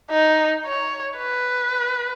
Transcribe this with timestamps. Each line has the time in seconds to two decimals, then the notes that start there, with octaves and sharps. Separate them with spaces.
0.11 D#4
0.65 C#5
1.18 B4